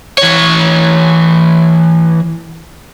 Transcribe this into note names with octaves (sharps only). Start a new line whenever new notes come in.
E3 C#5